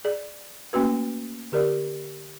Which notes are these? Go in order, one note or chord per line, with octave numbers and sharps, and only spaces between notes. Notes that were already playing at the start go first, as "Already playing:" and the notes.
G#4 D5
A3 A#3 C#4 F#4 B4
D3 G4 A#4 D5